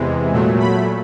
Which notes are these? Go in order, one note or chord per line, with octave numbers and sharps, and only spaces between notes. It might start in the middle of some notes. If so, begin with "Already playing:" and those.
Already playing: E2 C3 E3 G#3
A#2 F#3 A3
B5